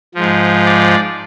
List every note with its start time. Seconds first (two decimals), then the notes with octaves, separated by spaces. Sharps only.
0.15 G#2 F3
0.65 D5